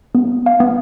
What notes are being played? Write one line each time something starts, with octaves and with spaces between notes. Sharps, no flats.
B3
F5
B3